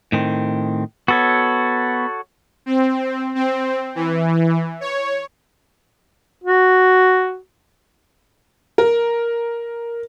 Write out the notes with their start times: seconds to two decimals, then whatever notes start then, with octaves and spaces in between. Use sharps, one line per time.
0.12 A2 D#3 C4
1.08 B3 F#4 A4 C#5
2.66 C4
3.35 C4
3.95 E3
4.81 C#5
6.43 F#4
8.78 A#4